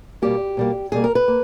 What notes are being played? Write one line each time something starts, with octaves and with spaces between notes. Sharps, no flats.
B2 G3 A#3 G4
B2 G3 A#3
B2 G3 A#3 G#4
A#4
B4
A#3